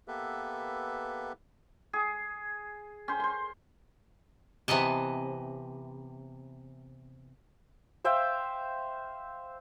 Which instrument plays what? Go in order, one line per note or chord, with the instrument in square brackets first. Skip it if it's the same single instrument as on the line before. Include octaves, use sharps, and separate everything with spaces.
[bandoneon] A#3 B3 G4 A4 B4 E5
[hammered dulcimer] G#4
C#4 C5
C5 C6
[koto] C3 E3 B3 D#5 A5
[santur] C5 E5 F5 G5